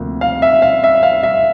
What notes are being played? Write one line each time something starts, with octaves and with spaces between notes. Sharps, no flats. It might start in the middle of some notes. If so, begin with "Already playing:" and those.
Already playing: D2 C3 F3 A#3
F5
E5
F5
E5
F5
E5